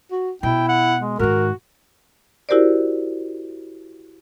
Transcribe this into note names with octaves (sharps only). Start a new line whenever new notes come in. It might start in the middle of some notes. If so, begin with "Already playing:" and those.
F#4
B2 E4 G5
F#5
G#3
G#2 D#3 F#4 A#4
E4 F#4 G4 A#4 C5 D5